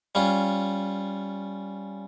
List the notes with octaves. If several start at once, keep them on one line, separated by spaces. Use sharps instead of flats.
G3 C#4 F4